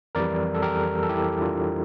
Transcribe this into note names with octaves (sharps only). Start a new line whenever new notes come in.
F2 E3 G3 A#4 D5
A4
G4 A#4
A4
E4 G4
D4 F4